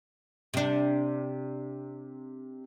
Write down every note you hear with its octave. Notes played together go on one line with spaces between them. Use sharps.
C3 D4